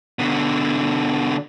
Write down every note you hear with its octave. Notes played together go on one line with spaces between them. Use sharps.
B2 D3